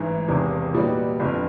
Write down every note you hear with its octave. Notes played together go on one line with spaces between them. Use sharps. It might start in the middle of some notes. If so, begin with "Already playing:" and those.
Already playing: A1 G#2 E3
E1 E2 C3 D#3
A#2 G3 B3 D#4 F#4
G1 F2 D3